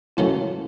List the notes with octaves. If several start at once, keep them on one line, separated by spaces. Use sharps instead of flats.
D#3 F#3 A3 C#4 E4 F4